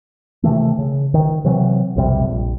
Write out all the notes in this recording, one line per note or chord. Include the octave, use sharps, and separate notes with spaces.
C3 D#3 E3 A3
C#3
D#3
C3 E3 F#3 C4
B1 F2 C3 G3
A#1